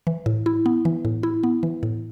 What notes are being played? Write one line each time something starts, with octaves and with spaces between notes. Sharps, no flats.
E3
A2
E4
B3
E3
A2
E4
B3
E3
A2